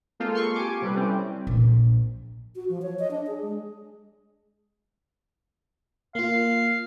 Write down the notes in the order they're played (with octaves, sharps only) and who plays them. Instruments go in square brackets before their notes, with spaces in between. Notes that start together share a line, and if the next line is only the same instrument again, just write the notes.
[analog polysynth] G#3 A#3 C4 F4 A4
F5 C6 C#6
G4 G#5 D6
C3 G3 A4 B4
G3 C4 C#4 E4
[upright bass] A#1
[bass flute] F#4
F3
C#5
D#5
D4
G#4
G#3
[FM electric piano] A#3 F4 [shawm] F5